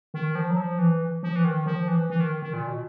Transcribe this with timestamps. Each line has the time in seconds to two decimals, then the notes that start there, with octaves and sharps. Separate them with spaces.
0.14 D#3
0.35 F3
0.50 F#3
0.57 F3
0.79 E3
1.23 F3
1.36 E3
1.45 D#3
1.66 F3
1.88 E3
2.10 E3
2.20 D#3
2.42 D#3
2.53 A#2
2.67 B2